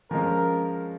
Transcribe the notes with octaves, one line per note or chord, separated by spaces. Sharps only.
F3 G#3 C#4 A#4